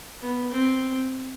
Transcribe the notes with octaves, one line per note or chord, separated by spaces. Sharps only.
B3
C4